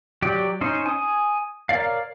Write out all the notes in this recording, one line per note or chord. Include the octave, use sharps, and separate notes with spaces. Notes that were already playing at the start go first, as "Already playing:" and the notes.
F#3 G4 D5
C#4 D#4 C5
G#5 D#6
A#4 C#5 D5 F5